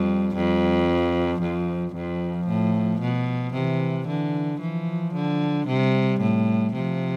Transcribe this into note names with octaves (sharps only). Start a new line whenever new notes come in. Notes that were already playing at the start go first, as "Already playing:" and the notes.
Already playing: F2 G3
F2 G3
F3
F2
F2 F3
A2
B2
C3 E3
D3 E3
E3 F3
D3
C3 G3
A2
C3 F3